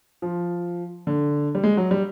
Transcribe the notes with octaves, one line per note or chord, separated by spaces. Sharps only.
F3
D3
G3
G#3
F#3
G3